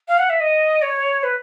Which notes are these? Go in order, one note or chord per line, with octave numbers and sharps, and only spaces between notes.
F5
F#5
E5
D#5
C#5
B4